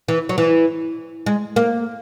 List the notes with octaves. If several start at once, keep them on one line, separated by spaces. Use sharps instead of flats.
E3
F#3
E3
G#3
A#3